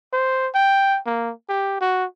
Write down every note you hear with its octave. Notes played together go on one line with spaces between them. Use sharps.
C5
G5
A#3
G4
F#4